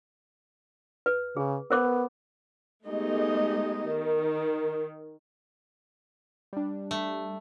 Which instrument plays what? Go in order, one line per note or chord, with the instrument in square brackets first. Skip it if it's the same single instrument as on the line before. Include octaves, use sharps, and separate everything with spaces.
[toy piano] B4
[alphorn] C#3 [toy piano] G#4
[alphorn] B3 [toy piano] A#4 C5 D6
[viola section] G#3 A3 B3 D#4 G4 D#5
D#3
[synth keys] G3 D4
[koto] A3